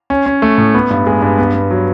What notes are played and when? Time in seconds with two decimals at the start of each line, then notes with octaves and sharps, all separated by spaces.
0.10 C#4
0.26 C#4
0.42 A3
0.58 A2
0.74 B3
0.90 G2
1.07 G#3
1.22 G2
1.38 B3
1.55 B3
1.71 F#3